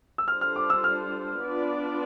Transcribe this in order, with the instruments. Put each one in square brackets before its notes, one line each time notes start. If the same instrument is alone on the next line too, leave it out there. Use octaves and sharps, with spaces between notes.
[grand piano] E6
[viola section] G3 D4 F4 A4 C5 [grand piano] F6
[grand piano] F6
D6
E6
F6
[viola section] B3 D4 F4 B4 D5